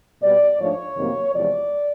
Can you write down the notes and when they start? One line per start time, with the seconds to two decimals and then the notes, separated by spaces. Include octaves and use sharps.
0.22 B2 G3 B3 D5
0.59 G#2 F3 A3 D4 C#5
0.96 F2 C3 D#3 F#3 A#3
1.34 E2 C3 F3 G#3 D5